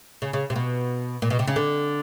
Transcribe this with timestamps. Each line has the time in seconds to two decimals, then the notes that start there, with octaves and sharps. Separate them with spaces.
0.22 C#3
0.33 C#3
0.50 C3
0.56 B2
1.22 A#2
1.30 B2
1.39 C3
1.47 C#3
1.56 D3